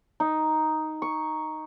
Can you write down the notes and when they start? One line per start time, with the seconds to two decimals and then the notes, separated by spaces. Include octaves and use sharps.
0.20 D#4
1.02 C#6